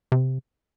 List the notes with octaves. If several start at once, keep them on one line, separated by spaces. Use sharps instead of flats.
C3